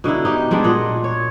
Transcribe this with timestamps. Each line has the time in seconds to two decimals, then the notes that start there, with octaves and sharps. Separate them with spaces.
0.04 B2 D3 D#4 E4
0.24 B3 D#4 G4
0.51 G3 G#3 B3 D4
0.64 A#2 D#5 F#5
1.04 C#5